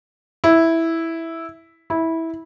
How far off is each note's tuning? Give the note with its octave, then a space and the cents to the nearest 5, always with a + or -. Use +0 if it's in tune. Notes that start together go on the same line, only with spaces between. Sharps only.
E4 -5
E4 -15